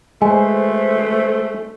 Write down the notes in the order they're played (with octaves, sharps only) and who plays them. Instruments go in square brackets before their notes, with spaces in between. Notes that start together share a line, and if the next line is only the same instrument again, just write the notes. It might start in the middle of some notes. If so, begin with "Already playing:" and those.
[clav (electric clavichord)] G#3 [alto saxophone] A3 [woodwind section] A4 B4 C5 [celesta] G#5